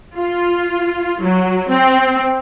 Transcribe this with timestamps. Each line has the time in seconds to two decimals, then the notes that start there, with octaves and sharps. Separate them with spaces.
0.16 F4
1.22 F#3
1.71 C4